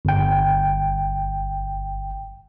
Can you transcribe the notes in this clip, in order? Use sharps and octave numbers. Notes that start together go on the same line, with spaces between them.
G1 G5